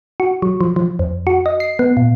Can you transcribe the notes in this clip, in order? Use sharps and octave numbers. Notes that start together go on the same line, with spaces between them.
F#4
F#3
F3
F3
F2
F#4
D#5
C7
B3
A#2